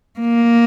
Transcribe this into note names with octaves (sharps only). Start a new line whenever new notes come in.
A#3